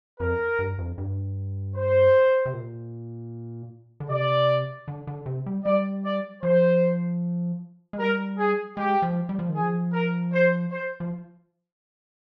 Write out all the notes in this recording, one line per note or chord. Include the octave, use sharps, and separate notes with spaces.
F2 A#4
G2
F2
G2
C5
C3
A#2
D3
C3 D5
D3
D3
C3
G3
G3 D5
D5
F3 C5
G#3
G3 A#4
G#4
G#3 G4
F3
G3
F3
D#3
G#4
F3
A#4
C5
C5
F3